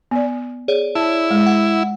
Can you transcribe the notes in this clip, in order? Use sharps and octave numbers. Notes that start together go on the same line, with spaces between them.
B3 D5
G#4 C#5 D5
E4 A5
G#3
F#5